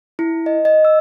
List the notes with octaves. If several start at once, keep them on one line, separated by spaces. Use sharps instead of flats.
E4
D#5
D#5
E6